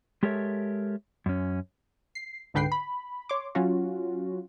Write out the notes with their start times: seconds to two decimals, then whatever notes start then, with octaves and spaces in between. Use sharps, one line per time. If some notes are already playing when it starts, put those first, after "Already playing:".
0.23 G#3 G4 A4 A#4 C#5 E5
1.26 F#2 C#4
2.15 C7
2.54 C#2 G#2 D3 B4 G5 C7
2.72 B5
3.29 C#5 C6 D6
3.55 F#3 C#4 F4 F#4